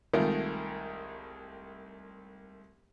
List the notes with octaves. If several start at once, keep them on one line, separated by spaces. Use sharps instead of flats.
C2 D#3 G#3 A3 F4 A#4